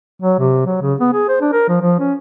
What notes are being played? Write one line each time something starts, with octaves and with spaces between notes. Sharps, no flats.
F#3
C3
F#3
C#3
B3
G#4
C5
D4
A#4
F3
F3
C#4